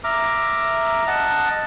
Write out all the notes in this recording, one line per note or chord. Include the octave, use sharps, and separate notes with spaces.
E5 A#5 D6 F6
D#5 F#5 A5